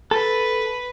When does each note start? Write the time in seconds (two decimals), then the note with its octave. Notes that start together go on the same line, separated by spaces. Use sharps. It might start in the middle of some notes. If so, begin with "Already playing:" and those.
0.11 A4 B4